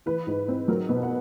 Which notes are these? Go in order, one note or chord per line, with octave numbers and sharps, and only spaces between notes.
E3 B4
G#2
C4
F#3 A#4
B2 B4
F#5